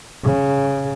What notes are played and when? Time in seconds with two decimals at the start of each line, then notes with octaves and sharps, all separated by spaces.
0.24 C#3